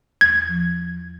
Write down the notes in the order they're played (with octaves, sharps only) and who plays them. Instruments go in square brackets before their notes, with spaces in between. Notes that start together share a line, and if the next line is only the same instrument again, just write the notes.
[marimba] E2 [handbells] G#6
[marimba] F3